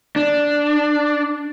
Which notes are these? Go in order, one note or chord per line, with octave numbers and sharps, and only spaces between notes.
D4